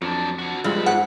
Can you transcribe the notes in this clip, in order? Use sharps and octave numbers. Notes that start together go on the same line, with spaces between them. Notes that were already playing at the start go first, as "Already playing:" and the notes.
F2 F#3 D4
D4 F#4
E2 G2 F3 G3 G#3 B5
G#2 F#5